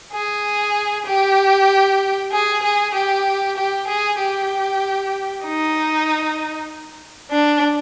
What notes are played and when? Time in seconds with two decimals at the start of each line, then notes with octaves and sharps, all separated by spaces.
0.12 G#4
1.06 G4
2.31 G#4
2.63 G#4
2.94 G4
3.56 G4
3.87 G#4
4.18 G4
5.44 D#4
7.31 D4